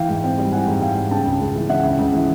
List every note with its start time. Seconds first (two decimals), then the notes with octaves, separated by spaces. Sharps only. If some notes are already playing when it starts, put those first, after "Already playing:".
Already playing: E3 F5 G5
0.09 G#2
0.23 C4 F5 G5
0.38 G3
0.52 E3 F#5 G#5
0.67 G#2
0.82 C4 F5 G5
0.96 G3
1.11 C#3 G5 A5
1.25 C#2
1.40 C#2
1.55 E3
1.69 C#3 E5 F#5
1.84 C#2
1.99 C#2
2.13 E3